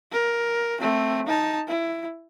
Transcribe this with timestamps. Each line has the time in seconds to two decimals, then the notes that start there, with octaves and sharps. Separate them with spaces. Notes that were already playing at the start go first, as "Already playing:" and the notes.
0.12 A#4
0.80 A3 C4
1.27 D#4 A5
1.68 E4